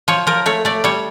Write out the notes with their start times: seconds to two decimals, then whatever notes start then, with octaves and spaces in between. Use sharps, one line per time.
0.08 F3 C#5
0.27 F3 A#4
0.46 A3 C#5
0.65 A3 D5
0.84 G3 C#5